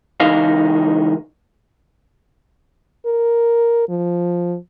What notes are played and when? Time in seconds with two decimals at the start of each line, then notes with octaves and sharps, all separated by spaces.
0.20 C#2 E3 D#4 A#4 D#5 F5
3.06 A#4
3.89 F3